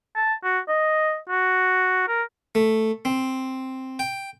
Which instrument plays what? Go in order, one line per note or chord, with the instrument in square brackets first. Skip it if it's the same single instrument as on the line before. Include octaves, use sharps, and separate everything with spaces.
[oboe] A5
F#4
D#5
F#4
A#4
[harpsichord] A3
C4
G5